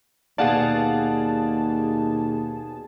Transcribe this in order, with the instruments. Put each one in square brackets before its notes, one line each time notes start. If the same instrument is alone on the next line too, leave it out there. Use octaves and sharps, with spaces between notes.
[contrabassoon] D#2 [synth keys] B2 G#4 A5 [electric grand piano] D5 F5 F#5